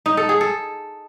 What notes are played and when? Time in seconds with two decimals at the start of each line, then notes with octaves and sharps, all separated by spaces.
0.06 D#4
0.17 A4
0.29 G#4
0.41 A4